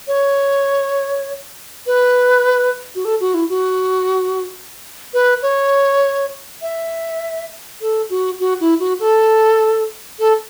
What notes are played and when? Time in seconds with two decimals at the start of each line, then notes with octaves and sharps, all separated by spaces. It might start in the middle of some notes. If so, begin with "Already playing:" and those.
0.07 C#5
1.86 B4
2.95 F#4
3.05 A4
3.20 F#4
3.34 E4
3.49 F#4
5.14 B4
5.42 C#5
6.62 E5
7.81 A4
8.10 F#4
8.40 F#4
8.60 E4
8.80 F#4
9.00 A4
10.19 A4